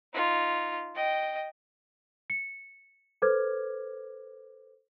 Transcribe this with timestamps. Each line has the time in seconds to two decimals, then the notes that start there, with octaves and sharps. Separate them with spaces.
0.14 D#4 F4
0.95 D#5 G5
2.30 C#7
3.22 A4 B4 C5 D6 F6 G#6